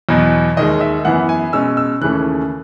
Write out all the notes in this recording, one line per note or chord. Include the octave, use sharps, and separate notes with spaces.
E2 B2 F#3
D#2 D#3 G#3 D#5
E5
F#2 E3 B3 F#5
G#5
B2 G#3 C#4 E6
E6
D#2 C#3 E3 A3 C#4 F#6